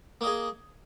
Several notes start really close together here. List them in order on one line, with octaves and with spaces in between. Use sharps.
A#3 D#5 G#4